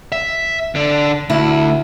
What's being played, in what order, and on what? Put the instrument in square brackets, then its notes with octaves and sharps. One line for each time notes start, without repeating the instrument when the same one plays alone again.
[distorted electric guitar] E5
D3 D4
[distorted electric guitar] D2 [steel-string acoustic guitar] E4